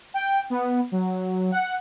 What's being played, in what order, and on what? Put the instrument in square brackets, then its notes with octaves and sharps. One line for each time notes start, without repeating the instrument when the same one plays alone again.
[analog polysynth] G5
B3
F#3
F#5